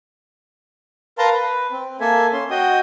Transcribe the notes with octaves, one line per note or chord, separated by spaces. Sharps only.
A#4 B4 F5 A5 A#5 C6
B4
C4
A#3 A4 E5 G#5
C#4 C6
F#4 D#5 G5 D#6